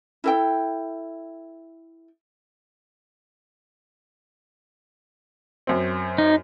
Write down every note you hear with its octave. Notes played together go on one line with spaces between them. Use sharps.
E4 A4 G5
F#2 C4
D#4